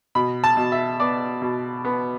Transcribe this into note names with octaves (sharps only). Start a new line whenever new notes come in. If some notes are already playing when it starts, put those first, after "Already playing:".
B2 B5
A5
B2
E5
B3 D5
B2
B3